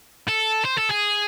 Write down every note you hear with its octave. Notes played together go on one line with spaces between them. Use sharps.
A4
C5
A4
G#4